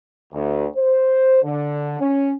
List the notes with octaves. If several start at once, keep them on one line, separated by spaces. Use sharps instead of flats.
D2
C5
D3
C#4